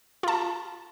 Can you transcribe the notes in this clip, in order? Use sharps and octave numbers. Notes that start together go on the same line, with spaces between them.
F4 A5